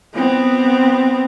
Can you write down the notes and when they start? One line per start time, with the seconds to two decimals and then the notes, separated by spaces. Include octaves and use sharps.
0.15 B3 C4